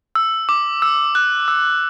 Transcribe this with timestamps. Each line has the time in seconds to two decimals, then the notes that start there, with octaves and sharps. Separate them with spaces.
0.15 E6
0.49 D6
0.82 E6
1.15 F#6
1.48 E6